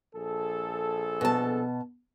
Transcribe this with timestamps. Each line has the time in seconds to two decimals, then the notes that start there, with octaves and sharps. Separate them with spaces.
0.14 A#1 G#4 A4
1.21 B2 A5